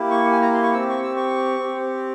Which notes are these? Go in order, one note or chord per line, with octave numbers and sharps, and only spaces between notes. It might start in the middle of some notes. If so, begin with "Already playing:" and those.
Already playing: A#3 E4 G4
C#6
G#5
A#5
C6
C#6
C4 G4 E6
C#6
E6
C#6
C4 G4